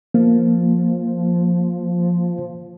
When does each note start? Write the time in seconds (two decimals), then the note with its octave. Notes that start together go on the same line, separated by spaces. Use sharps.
0.14 F3 A#3